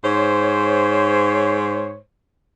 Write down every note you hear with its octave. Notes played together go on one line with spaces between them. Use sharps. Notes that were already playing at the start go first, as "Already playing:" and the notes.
G#2 C5 C#5